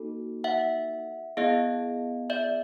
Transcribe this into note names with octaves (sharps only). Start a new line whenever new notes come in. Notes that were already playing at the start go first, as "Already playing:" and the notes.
Already playing: A#3 D#4 F#4 A4
E5 F#5
B3 E4 G#4 D#5 F5
D5 E5